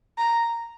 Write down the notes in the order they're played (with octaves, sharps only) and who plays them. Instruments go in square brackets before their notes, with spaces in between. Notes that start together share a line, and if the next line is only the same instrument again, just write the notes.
[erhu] A#5